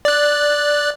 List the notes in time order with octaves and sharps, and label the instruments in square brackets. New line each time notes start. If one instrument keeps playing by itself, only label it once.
[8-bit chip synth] D5 F#6